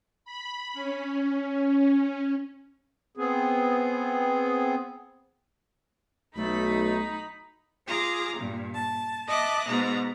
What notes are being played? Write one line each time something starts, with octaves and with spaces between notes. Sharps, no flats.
B5
C#4
B3 C4 G#4
B1 A3 D#4 B5
F4 G#4 A#5 D6
G2 A#2
A5
D#5 E5 A5 D6 D#6 F#6
G#2 B2 B3 B4 A#5